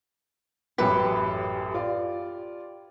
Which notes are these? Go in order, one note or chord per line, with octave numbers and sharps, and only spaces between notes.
A1 F#2 G4 B4 B6
F4 D5